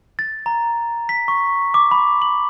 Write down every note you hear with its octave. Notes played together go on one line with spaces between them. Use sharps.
A6
A#5
B6
C#6
D6
B5
F#7